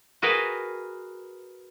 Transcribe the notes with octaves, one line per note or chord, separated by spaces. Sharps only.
F#4 G#4 A#4 B4 F5 G5